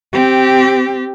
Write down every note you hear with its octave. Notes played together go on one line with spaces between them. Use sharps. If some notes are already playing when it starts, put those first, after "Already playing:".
C4 G4